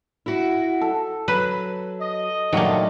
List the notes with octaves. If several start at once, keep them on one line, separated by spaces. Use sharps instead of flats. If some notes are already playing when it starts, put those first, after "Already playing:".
E4 F#4
A4
F#3 B4
D#5
G2 A#2 D#3 F#3 A3 A#3 F4